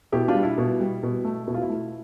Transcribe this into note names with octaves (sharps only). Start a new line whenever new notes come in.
B2 E4 G4
D4 F4
G3
E4
B2
G3
B2
A3
B2 E4
F4
E4
A3